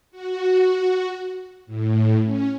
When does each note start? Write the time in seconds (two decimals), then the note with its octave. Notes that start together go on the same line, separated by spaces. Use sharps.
0.11 F#4
1.66 A2
2.24 C#4